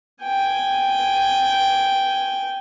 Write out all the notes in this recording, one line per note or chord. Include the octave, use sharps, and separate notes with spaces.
G5 G#5